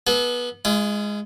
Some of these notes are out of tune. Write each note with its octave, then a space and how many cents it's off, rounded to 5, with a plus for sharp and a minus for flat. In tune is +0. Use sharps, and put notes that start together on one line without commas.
B3 -20 A4 -45
G#3 +0 F4 -45